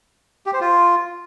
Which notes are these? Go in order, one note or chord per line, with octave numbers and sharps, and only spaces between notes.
G4
C5
F4